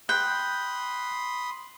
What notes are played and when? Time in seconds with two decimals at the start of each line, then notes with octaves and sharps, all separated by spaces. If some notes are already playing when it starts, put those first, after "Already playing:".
0.09 G5 B5 C6 D#6 F#6